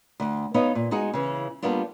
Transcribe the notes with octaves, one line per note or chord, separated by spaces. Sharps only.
D2
B3 D#4 C#5 D#5 F5
A#2
G#3 D#4 F#4 G#4
C#3 E3
G3 A#3 B3 D4 F4